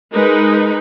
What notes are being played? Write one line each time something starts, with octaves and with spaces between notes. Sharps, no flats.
G#3 D#4 A#4 B4